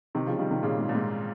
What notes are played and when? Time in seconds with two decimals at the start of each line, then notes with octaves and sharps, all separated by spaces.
0.15 C3 D#3
0.27 C#3 F3
0.38 D#3 G3
0.51 C3 D#3
0.63 A#2 C#3
0.79 G#2
0.89 A#2
0.95 G#2